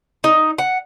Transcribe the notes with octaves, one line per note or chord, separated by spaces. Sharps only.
D#4
F#5